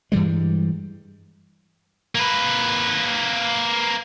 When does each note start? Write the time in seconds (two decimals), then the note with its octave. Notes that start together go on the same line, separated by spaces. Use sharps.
0.12 G2 E3 G3 G#3
2.15 A#3 B4